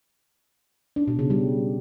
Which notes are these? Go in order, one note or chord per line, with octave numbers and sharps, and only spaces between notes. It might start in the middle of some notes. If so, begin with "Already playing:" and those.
D4
B2
C#3
G3